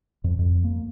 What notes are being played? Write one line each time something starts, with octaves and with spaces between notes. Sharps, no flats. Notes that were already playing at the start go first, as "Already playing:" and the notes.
F2
F2
A#3